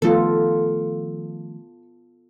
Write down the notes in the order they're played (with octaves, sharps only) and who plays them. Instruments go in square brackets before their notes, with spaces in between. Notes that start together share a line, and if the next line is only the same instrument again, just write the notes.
[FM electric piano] D#3 F3 A3 [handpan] B3 F4 [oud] A4